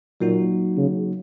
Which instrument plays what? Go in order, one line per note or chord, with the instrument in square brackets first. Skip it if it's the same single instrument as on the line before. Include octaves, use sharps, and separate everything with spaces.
[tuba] A#2 [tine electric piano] F#3 A#3 D#4 F#4
[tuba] C#3